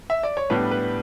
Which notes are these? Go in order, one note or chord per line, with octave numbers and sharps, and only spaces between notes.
E5
D5
C#5
A2 G3 B3 D4 B4
B4